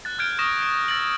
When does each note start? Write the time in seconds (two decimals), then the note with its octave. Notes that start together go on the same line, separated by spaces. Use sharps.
0.05 F#6 A6
0.19 F6 G6 G#6 D7
0.39 C#6 D#6 A#6 E7
0.62 D7
0.88 E6 A6 D7 F#7